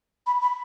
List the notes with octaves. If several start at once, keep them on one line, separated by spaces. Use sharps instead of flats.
B5
B5